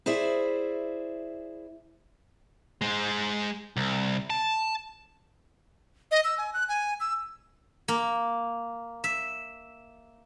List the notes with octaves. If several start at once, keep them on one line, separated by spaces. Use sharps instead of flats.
E4 G#4 C5 D5 E5
G#3 C5
C2
A5
D#5
E6
G#5
F#6
G#5
E6
A#3
E5